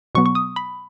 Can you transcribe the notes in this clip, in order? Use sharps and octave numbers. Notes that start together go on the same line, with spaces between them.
B2 F#3 B3 C#6
C#6
D#6
B5